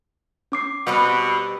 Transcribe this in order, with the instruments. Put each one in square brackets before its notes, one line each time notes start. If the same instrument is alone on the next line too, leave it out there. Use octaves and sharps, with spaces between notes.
[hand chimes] C#4 D6 C7
[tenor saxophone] B2 [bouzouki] G3 C4 B4